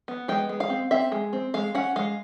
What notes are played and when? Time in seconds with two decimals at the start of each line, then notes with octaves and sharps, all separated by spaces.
0.08 B3
0.28 G#3 G5
0.49 G#3
0.60 F5
0.70 C4
0.91 C4 E5
1.12 G#3
1.33 C4
1.54 G#3 F5
1.75 C#4 F#5
1.96 G#3 F5